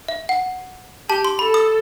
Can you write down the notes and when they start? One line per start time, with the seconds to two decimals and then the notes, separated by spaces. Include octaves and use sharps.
0.08 E5
0.29 F#5
1.09 G4 A5
1.25 C6
1.39 A4 B5
1.54 D#6